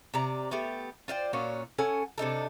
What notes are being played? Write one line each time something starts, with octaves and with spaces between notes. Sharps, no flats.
C3 G4 D5 A#5
A3 B3 G4
F4 C5 D5 G5
A#2 C#4 F4 F#4
C#4 A4 F#5 G#5
C3 D4 D#4 A4